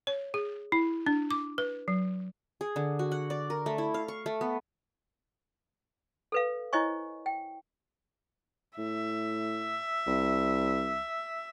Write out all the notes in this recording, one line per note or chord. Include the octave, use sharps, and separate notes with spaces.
C#5
G#4
E4
D4
D6
B4
F#3
G#4
D3
F#4
F#5
D5
A#4
A3
E4
F5
C#6
A3
B3
A4 B4 F5
E4 C5 C#5 D#5 G#5 C#6
G5
A2 E5
C2